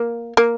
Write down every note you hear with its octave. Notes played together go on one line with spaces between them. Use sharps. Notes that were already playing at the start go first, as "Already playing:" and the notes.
Already playing: A#3
A#3